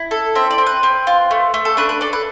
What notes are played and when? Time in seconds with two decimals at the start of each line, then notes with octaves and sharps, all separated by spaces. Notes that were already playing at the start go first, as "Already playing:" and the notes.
Already playing: E4
0.11 A4
0.35 C4 E5
0.51 D5
0.58 C4
0.66 B4
0.83 C4
1.07 F4
1.31 A3
1.54 A3
1.65 A4
1.77 D4 B4
1.89 B4
2.01 A4 D5
2.13 B4